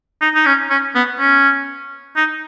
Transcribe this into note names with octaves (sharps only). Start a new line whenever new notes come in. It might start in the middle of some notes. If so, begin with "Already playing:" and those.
D#4
D#4
C#4
C#4
B3
C#4
D#4